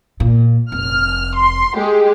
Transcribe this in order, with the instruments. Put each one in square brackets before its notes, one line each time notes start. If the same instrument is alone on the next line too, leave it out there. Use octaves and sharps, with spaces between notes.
[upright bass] A#2
[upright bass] F1 [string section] F6
[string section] C6
G#3 G4